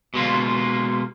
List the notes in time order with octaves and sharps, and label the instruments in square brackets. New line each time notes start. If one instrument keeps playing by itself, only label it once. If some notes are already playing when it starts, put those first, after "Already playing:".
[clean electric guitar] B2 G#3 A#3 F4